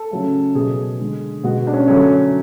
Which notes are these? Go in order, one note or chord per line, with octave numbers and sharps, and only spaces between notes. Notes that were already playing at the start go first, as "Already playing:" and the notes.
Already playing: A4
C#3 F#3 A3
B2 F#3 A3 G#4
D3 G#3
B2 G#3 F#4
D4
C#4
D3 F#3 A3 C#4